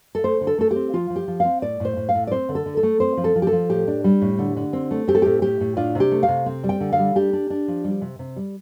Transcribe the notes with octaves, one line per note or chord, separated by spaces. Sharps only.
A4
A3 C5
D3
A4
A3 A4
G4
C4
F3 F4
F3
G4
F3
C4 F5
A2 D5
A2 C5
A2
F5
A2
D5
C4 C5
D3
A4
D3
A4
A3
C4 C5
F3
A4
F3
G4
A4
F3
A2 G4
D4
G3
A2
D3
D3
C4
A3
C4 G4
A4
A2 G4
A2 G4
A2
D4 F4
C3 G4
A3
F5
C3
C4
G3
G5
D3
F5
G3
D4 G4
D4
D4
F3
G3
C3
C3
G3